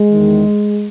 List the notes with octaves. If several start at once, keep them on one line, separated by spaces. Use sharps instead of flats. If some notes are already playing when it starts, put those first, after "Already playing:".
Already playing: G#3
E2 D#3